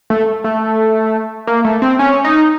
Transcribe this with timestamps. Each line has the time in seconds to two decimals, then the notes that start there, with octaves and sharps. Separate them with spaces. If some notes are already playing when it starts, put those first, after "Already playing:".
0.10 A3
0.44 A3
1.47 A#3
1.65 A3
1.82 C4
1.99 C#4
2.24 D#4